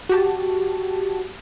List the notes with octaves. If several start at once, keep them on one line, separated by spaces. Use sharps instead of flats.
F#4 G4 A5